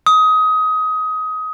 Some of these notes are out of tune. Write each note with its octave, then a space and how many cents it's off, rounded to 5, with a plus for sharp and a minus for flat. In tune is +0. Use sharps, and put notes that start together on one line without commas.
D#6 +20